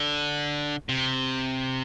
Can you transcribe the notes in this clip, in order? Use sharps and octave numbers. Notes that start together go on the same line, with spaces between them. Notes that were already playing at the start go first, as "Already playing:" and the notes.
Already playing: D3
C3